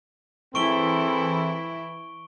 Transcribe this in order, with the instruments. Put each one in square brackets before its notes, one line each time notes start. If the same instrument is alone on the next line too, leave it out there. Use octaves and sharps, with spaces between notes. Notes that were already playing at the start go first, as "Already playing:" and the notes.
[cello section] E3 E4 [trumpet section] C4 G#4 A4 [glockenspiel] C#6 D7 G7